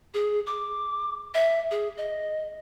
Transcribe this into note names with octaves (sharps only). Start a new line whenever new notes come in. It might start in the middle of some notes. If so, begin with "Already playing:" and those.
G#4
D6
E5
G#4
D#5